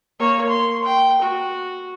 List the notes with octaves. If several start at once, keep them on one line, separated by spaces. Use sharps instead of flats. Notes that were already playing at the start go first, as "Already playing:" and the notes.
A#3 C#5
C6
G5
F#4